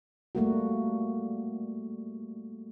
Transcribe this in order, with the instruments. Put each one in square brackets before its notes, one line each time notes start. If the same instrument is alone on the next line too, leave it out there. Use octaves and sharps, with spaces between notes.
[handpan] G3 A3 A#3 F#4